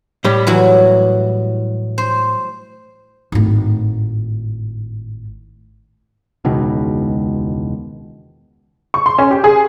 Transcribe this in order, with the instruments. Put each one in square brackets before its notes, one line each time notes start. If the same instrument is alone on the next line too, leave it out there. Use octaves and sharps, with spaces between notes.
[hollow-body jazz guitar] A2 G3
[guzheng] E3 F#3 F#4
C5
[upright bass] G#1 A2
[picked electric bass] E1 C#2 B2 D#3
[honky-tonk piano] C#6
C6
C#4
G4
G#4